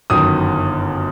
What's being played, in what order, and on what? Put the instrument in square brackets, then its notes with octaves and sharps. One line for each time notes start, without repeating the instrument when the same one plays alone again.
[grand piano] G1 F#2 D#3 D#6